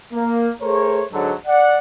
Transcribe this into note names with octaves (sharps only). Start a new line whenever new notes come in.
A#3
A3 G#4 A#4 C5 C#5
G#2 D3 F#3
D5 F#5